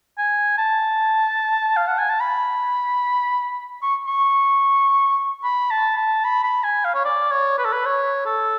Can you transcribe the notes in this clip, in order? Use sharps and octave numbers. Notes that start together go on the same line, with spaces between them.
G#5
A5
F5
F#5
G#5
A5
B5
C#6
C#6
B5
A5
A5
B5
B5
G#5
F5
C#5
D5
C#5
B4
A4
B4
C#5
A4